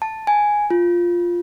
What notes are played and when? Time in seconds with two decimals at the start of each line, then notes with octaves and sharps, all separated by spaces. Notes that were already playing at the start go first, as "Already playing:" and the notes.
0.02 A5
0.27 G#5
0.70 F4